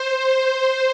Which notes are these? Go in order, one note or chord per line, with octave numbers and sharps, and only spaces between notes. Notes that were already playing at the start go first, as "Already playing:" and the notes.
Already playing: C5
C5